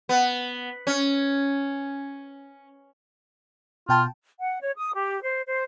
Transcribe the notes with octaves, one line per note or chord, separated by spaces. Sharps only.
B3
C#4
B2 F4 G5 A5
F#5
C#5
D#6
G4
C5
C5